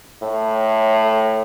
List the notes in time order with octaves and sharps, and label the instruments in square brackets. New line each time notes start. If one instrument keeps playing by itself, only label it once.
[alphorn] A2